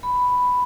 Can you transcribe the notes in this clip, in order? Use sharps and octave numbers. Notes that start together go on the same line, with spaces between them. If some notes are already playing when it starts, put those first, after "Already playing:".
B5